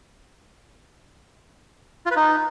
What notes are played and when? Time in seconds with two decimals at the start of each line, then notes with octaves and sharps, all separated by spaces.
2.06 F4
2.11 B4
2.16 D#4